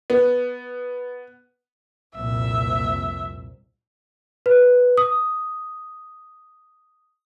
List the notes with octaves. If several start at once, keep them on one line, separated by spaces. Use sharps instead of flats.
B3
C2 F2 A#2 E5
B4
D#6